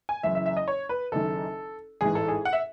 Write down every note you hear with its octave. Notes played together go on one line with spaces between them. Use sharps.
G#5
F#1 F#2 E3 E5
E5
E5
D#5
C#5
B4
F#1 F#2 D#3 A4
A1 G#2 E3 G#4
A4
G#4
F#5
E5